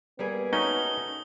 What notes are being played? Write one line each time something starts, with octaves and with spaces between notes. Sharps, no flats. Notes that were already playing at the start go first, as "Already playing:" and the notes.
G3 A#3 B3 G#4
A3 C#4 D#4 F#4 D#6 G7